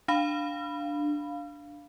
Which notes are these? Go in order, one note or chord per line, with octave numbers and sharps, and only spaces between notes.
D4 F5 B5